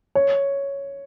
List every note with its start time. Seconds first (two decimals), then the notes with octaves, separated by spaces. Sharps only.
0.15 C#5